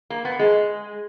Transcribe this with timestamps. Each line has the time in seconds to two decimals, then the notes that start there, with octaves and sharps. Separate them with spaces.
0.10 A#3
0.25 B3
0.39 G#3